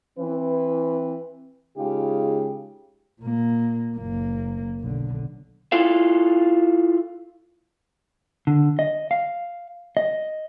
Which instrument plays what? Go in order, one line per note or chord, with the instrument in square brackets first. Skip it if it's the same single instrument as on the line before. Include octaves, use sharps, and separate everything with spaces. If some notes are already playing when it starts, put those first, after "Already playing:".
[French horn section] E3 C4 B4
C#3 G#3 D#4 F4 G4 G#4
[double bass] A#2 A#3
F#1 A#3
B1 D3
[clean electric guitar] E4 F4 A4 F5
D3
D#5
F5
D#5